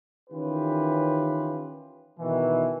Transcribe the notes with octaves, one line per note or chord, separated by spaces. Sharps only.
D#3 E3 C#4 F4 G4 B4
B2 D#3 E3